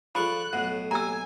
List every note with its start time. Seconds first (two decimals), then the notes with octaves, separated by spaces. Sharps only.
0.15 F3 F4 G#4 A4 D5 B5 C#6 F#6
0.53 B1 A2 F#5
0.91 A#3 G4 G#5 A#5 E6